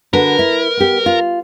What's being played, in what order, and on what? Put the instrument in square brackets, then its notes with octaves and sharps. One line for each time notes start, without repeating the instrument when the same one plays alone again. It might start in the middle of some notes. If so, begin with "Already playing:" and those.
[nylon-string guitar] D3 F#4 B4 [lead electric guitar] A#4
[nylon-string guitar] E4
B3 G4
F4